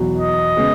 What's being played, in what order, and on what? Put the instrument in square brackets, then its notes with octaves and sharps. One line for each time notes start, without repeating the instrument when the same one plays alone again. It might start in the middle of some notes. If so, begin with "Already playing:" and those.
Already playing: [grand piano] E2 B2 F#3
[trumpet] D#5
[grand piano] C#3 G#3 B3